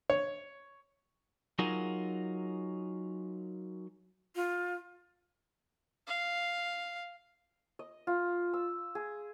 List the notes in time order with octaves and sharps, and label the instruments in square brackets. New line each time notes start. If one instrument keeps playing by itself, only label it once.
[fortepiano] C#5
[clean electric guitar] F#3 D#4 F4 G#4 A#4 F#5
[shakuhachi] F4
[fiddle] F5
[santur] D#5
F4
E6
G#4